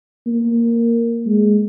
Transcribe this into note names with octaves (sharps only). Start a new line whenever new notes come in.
A#3
G#3